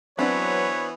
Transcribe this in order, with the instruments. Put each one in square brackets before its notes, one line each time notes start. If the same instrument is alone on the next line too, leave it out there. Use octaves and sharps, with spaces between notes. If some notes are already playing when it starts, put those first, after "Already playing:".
[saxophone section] E3 B3 [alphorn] F#3 [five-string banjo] C4 D4 F#4 [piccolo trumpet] C#5